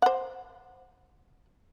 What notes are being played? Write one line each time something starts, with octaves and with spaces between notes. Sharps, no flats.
C5 F#5